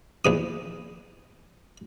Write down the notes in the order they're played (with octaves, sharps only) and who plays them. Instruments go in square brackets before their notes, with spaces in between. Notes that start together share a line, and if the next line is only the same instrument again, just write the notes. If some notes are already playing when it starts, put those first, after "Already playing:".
[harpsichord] A#1 E2 D#6